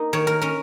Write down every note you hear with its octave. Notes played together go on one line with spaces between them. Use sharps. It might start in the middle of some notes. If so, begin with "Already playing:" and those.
Already playing: A#3 D#4 D#5
D#3 C#5
A#4
C#4 A#4